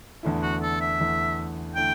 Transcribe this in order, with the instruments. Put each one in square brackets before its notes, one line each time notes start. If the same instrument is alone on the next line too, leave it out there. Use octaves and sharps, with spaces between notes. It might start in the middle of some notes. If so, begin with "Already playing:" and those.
[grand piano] E2 D3 A3 E4
[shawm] F#4
A4
E5
[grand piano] E2 D3 A3 E4
[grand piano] D3 A3 E4 [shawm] G5